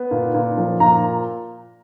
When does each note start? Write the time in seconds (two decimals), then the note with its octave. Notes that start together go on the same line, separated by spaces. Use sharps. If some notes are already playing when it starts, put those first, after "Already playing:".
Already playing: B3
0.11 A#2
0.34 A#2
0.58 F3
0.80 A#2 A#5